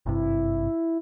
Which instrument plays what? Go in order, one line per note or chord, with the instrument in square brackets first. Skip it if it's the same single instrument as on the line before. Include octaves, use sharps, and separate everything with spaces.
[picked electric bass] G#1 G2 C3 [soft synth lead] E4